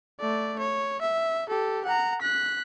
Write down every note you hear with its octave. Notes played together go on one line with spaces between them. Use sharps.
A3 D5
C#5
E5
G4 A4
F#5 A#5
F#6 B6